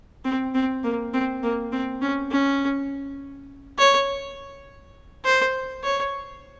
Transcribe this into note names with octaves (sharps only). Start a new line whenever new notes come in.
C4
C4
A#3
C4
A#3
C4
C#4
C#4
C#5
C5
C#5